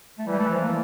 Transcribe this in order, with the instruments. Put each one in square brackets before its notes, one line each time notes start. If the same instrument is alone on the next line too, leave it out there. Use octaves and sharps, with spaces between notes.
[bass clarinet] A3
[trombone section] E3 [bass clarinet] G3
[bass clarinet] A3
F3
A#3